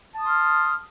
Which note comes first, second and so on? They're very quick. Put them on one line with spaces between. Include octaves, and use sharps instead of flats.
A5 D#6 C6 F6